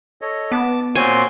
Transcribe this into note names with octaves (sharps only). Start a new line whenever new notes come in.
A4 C#5 D#5
B3 A5 D6
A#2 C4 F#4 C5 C#5 G#5 C6